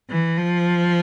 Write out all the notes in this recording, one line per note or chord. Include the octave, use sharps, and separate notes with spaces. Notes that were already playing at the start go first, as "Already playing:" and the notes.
E3
F3